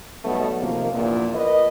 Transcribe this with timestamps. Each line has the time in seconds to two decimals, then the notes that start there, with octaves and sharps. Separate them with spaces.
0.24 B1 B2 G3 A3 B3
0.61 C3 D#3 F3 A#3
0.91 A#1 E2 A#2
1.34 A#4 B4 D#5